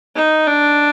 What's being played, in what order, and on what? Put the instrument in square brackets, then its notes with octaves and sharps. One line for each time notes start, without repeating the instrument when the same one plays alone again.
[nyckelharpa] D#4
D4